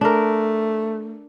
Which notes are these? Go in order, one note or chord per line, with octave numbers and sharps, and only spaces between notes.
A3 D4 A#4